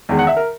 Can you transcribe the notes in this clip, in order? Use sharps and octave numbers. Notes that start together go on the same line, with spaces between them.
E2 D#3 G#3
F#5
E5
A#4